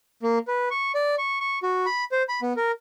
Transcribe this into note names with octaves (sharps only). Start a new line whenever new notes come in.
A#3
B4
C#6
D5
C#6
C#6
F#4
B5
C5
B5
B3
A#4